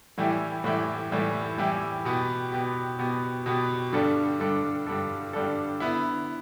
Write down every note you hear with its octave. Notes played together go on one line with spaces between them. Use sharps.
A2 E3 G3 E4 G4
A2 E3 G3 E4 G4
A2 E3 G3 E4 G4
A2 E3 G3 E4 G4
B2 B3 G4
B2 B3 G4
B2 B3 G4
B2 B3 G4
G2 D3 G3 D4 A4
G2 D3 G3 D4 A4
G2 D3 G3 D4 A4
G2 D3 G3 D4 A4
D3 B3 E4